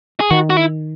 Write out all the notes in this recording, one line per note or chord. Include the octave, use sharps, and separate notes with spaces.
G#4
D#3 F#4
F#4
E4